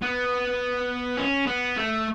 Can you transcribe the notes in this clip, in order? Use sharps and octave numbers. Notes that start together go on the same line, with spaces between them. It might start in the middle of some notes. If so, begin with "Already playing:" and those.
B3
C#4
B3
A3